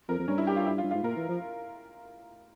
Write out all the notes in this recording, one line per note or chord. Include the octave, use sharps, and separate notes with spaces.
F2 A#4
F2
G2 C#4
E4
G4
F4
E4
F4
G2
F4
G#2
A#2 A#4
E3
F3